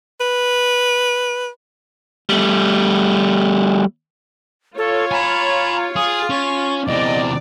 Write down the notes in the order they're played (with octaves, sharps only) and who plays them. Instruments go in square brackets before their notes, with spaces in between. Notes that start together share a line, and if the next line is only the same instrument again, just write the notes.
[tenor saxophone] B4
[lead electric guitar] G3 A3
[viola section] F4 C#5 [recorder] A4
[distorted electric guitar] G#5 A#5 [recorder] B5
[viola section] F4 [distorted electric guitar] G#4 [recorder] D#6
[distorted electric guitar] C#4 [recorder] C#6
[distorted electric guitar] E2 C3 [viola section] D5 [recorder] D#5